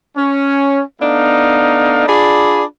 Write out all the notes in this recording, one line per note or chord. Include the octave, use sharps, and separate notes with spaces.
C#4
A3 B3 D4 D#4 F5
D4 F4 G#4 D5 B5